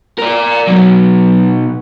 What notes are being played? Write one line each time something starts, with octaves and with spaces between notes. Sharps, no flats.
A#4 D5
B2 F#3